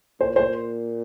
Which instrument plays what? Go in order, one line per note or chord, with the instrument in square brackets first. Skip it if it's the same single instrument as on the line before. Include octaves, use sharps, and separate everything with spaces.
[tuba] A#2 [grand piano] C5
[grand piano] C5